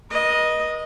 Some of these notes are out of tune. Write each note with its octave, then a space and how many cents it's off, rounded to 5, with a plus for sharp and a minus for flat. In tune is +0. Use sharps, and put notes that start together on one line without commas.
B4 -45 D#5 +0